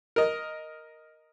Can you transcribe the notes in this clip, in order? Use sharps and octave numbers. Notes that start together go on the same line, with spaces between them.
A#4 D#5